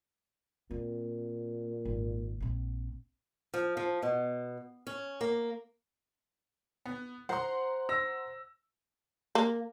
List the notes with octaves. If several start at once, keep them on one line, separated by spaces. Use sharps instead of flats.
A#2 C4
G#1
A#1 C4
F3
F3
B2
C#4
A#3
B3
C5 F#5 A#5 C6
E6 A#6
A#3